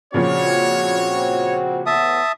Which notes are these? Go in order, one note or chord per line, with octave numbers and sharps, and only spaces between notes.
A#2 C#3 F3 C4 F#4 C#5
E2 A2 B3 E5 A5 D#6